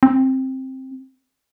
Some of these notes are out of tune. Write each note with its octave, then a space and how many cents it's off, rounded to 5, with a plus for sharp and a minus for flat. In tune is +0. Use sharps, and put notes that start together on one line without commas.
C4 +10